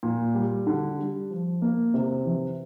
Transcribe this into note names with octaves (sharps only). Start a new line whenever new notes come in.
A#2
G3
D3
G3
F3
A#3
C3
E3